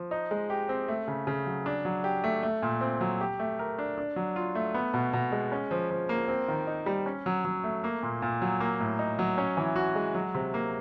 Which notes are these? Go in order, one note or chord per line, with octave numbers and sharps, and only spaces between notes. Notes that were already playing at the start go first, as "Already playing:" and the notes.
Already playing: F3
D#4
G#3
G4
C4
A3
C#3
C#3
F#3
D4
F#3
G4
A3
A3
A#2
C4
F#3
G4
A3
A#4
D4
D4
F#3
F4
A3
B3
B2
B2
G#3
C#4
F3
F3
A#3
C4
D#3
D#4
G3
C#4
F#3
F#3
A3
A#3
A#2
A#2
F#3
A#3
A2
D#4
F#3
C#4
E3
F#4
G#3
F#3
C3
A#3